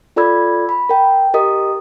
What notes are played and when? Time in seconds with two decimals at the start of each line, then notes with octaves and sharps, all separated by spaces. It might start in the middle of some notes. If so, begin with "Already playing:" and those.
0.16 F4 A4 D5 B5 E6 G#6
0.69 B5
0.89 A#4 G5
1.34 G4 A#4 D#5 D#6